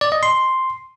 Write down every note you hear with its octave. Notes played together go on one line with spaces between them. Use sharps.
D5
D#5
C6